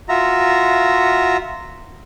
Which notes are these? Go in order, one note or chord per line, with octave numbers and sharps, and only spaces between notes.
F4 F#4 E5 A#5